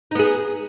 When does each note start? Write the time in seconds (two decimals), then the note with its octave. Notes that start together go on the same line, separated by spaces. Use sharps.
0.11 D#4
0.15 B3
0.19 G#4